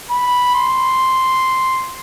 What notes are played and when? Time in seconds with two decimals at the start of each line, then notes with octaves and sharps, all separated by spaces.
0.11 B5
0.55 C6